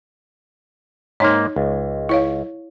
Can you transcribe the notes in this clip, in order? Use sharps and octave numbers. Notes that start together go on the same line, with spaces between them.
G#2 A#3 D#4 C#5
C#2
E4 C#5 F5